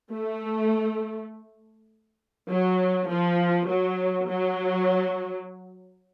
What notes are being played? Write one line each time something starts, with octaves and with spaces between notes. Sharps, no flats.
A3
F#3
F3
F#3
F#3